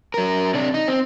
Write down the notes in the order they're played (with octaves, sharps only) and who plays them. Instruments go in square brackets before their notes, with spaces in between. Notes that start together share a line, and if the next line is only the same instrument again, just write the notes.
[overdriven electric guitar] F#3 A#4
C3 D4
D#4
C4